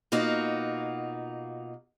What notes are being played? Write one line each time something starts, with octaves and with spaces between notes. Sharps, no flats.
B2 A#3 D#4 F4 F#4